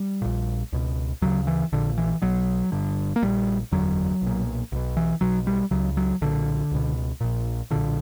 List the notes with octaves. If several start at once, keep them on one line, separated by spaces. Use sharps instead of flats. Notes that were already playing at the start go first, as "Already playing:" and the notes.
Already playing: G3
A#1 A#2
C#2 B2
D2 C#3 F#3
E3
A#1 A#2 D3
E3
B1 B2 F#3
G1 G2 D3
A#3
A#1 A#2 G3
F#1 E2 D3 F#3
B1 A#2
B1 B2
E3
B1 B2 F#3
G3
C#2 C#3 F#3
F#3
B1 A#2 D3
C#2 B2
A#1 A#2
B1 A#2 D3